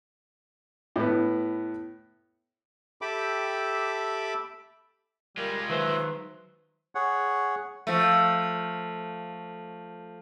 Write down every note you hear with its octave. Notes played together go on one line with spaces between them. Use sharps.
A2 B3
G4 A4 E5 G5 B5 D6
G3 G#3 F4 A#4
D#3 F#3 B4 C5 E5
G#4 C#5 F#5
F3 A3